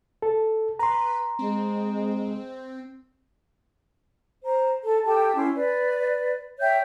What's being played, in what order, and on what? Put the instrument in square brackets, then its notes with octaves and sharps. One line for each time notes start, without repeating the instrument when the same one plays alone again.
[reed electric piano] A4
[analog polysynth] B4 [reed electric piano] A#5 C6
[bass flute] G#3 [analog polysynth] C4
[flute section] C5 A#5
A4
G4 A4 G5 A5
C#4 E4 C6
B4 D5
C#5 E5 G5 G6